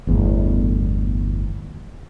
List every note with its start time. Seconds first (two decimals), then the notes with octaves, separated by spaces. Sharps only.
0.07 G1 E2 A2